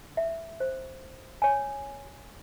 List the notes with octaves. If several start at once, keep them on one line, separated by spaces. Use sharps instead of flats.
E5
C5
C#5 G#5